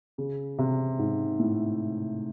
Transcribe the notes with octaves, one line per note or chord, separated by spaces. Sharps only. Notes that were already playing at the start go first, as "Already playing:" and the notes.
C#3
C3
G#2
A2